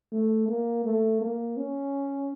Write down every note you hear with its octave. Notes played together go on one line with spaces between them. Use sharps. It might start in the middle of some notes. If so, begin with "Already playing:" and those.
A3
A#3
A3
A#3
C#4